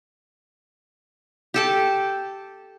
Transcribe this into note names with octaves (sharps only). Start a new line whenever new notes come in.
G4 A4 A5